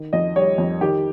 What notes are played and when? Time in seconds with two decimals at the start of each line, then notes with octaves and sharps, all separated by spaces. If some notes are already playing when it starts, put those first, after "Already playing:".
Already playing: D#3
0.13 F2 D#5
0.36 G3 C#5
0.58 F2
0.81 D#3 G4